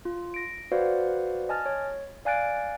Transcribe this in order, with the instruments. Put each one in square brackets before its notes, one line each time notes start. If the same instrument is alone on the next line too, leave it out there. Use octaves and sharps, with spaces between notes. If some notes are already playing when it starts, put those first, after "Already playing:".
[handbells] F4
A#6 D7
F#4 B4 C5 D5 F5 F#5
D#5 G#5 A5 F6 A6
C#5
D5 F5 G#5 F#6 A6 D7